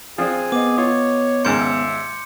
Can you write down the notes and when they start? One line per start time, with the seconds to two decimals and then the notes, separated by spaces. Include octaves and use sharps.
0.18 F3 C4 D4 G#4
0.52 B3 D#5 D6
0.78 F4 C#5 D#6
1.45 D#2 G#2 C#3 A#4 C6 G6 C#7
1.60 E5 C#7